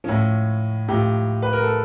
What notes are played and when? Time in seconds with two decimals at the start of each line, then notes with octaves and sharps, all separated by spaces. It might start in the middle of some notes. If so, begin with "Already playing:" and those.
0.04 A2 F3 C#4
0.88 A2 F3 G4
1.42 B4
1.53 A#4
1.63 A4